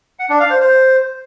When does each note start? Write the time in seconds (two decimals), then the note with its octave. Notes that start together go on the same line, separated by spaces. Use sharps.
0.19 F#5
0.30 D4
0.40 F5
0.50 C5
0.60 C5